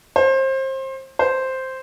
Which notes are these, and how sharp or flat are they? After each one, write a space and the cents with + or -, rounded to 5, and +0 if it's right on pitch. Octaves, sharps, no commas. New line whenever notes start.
C5 +30
C5 +0